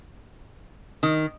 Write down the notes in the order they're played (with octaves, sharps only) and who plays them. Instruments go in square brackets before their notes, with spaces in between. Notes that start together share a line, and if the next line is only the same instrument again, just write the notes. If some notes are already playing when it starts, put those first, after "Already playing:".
[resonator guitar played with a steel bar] D#3